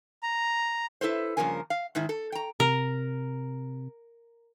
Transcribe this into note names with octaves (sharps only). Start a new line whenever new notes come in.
A#5
E4 A4 B4 C5
G2 C#3 F3 A#3 A#4 G#5
F5
G#2 D#3 E4
A4
G5 A#5
C3 A#4